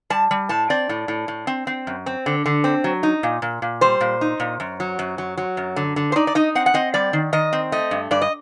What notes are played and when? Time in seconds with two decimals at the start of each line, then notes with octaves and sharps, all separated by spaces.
0.10 G3 A5
0.31 G3
0.49 A2 A5
0.70 C4 D5
0.89 A2
1.08 A2
1.28 A2
1.47 C4
1.67 C4
1.87 F#2
2.06 C4
2.26 D3
2.46 D3
2.64 C4
2.84 F#3
3.03 D#4
3.23 A#2
3.42 A#2
3.62 A#2
3.81 G3 C5
4.01 A#2
4.21 D#4
4.40 A#2
4.60 F#2
4.80 F#3
4.99 F#2
5.18 F#3
5.37 F#3
5.57 F#2
5.76 D3
5.96 D3
6.12 C5
6.16 D#4 D5
6.27 D5
6.35 D#4 D#5
6.55 C4 F#5
6.66 F#5
6.74 C4 D#5
6.94 G3 D5
7.13 D#3
7.33 D#3 D#5
7.53 C4
7.72 A3 D#5
7.91 G2
8.11 G2 D5
8.21 D#5